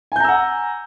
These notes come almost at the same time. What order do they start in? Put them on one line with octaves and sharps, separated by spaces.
G#5 G6 A#5 E6 F#5